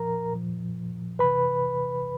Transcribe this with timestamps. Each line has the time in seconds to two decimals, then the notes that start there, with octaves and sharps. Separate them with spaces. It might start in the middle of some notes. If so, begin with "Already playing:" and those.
Already playing: A#2 F3 A#4 A#5
0.32 A#2 F3
1.19 C3 E3 B4 B5